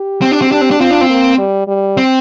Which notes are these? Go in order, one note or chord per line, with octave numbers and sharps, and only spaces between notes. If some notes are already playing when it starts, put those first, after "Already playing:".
Already playing: G4
C4
D4
C4
D4 G4
C4
D4
C4 F4
D4
C4
A#3
G3
G3
C4